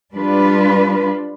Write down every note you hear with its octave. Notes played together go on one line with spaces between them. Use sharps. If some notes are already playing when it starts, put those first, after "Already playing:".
G3 D4 F4 B4